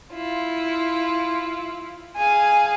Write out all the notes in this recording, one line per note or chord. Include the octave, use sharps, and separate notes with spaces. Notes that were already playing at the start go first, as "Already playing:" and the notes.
E4 F4
G#4 F5 G#5